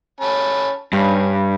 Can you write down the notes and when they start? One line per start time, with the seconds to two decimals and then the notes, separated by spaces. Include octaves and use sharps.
0.20 C#4 A5 B5
0.93 G2 C#4